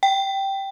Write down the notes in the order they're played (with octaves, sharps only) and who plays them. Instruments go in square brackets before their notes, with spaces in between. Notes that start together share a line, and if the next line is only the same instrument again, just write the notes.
[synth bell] G5